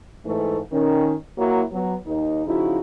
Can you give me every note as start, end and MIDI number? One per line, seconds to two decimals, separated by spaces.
0.24 0.57 44
0.24 0.57 52
0.24 0.57 57
0.71 1.13 51
0.71 1.13 61
1.37 1.62 54
1.37 1.62 58
1.37 1.62 64
1.72 1.94 54
1.72 1.94 59
2.06 2.44 39
2.06 2.44 63
2.46 2.80 49
2.46 2.80 53
2.46 2.80 63
2.46 2.80 64
2.46 2.80 66